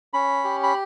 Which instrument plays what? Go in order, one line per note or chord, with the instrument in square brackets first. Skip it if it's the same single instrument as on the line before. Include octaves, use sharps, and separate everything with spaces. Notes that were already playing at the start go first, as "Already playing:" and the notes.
[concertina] C#4 B5
G4
B5